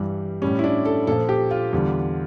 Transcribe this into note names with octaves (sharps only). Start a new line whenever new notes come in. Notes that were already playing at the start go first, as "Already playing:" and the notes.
Already playing: G2 E3 G3
A2 G3 C#4
E4
D4
A4
A#2 F3 A4
G4
F4
E2 D3 G3